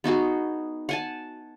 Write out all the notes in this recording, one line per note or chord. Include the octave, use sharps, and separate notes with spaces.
B3 D#4 F#4 G#4
F#5 G#5 A5